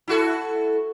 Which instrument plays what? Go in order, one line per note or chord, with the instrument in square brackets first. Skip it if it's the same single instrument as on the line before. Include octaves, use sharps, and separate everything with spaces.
[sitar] E4 F#4 A4